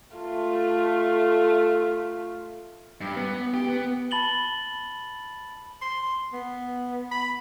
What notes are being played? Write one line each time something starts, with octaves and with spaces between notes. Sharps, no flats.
A3 F4
G2
B3
G4
B3
A5 B5 A6 F#7 G7
C6
B3
B5